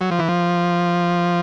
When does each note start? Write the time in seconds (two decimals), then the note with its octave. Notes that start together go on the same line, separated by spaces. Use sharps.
0.01 F#3
0.11 F3
0.19 E3
0.29 F3